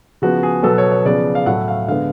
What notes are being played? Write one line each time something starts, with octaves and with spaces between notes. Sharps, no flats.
C#3 F3 B3 F#4
G#4
B2 F#3 B3 A4
C#5
C#5
C#3 F3 B3 D5
F5
A2 F#3 A3 F#5
F5
D3 G#3 B3 F5